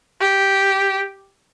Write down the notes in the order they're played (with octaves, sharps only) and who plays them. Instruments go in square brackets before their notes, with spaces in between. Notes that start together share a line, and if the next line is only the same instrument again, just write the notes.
[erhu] G4